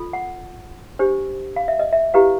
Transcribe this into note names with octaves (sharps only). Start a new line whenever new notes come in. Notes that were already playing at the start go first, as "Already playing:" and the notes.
Already playing: F4 A4
F#5
D4 G4 C5
F5
E5
D#5
E5
E4 G4 B4 F5